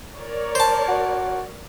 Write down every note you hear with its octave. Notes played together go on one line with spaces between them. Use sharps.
A#4 C#5 D5
C5 A5
F#4